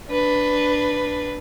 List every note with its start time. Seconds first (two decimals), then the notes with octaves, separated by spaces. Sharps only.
0.10 D4 B4